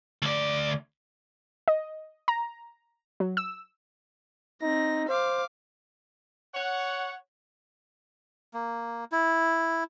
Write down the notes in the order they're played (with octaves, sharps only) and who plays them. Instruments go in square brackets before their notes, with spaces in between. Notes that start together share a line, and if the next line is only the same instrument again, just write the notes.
[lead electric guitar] D2 D5
[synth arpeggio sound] D#5
A#5
F#3
E6
[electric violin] C4 A#6 [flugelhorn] D#4
[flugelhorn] C5 [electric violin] F5 D6
[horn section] C#5 F#5
[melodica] A#3
E4